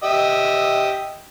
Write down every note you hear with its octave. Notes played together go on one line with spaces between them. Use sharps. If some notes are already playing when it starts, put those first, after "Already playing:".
G4 D#5 E5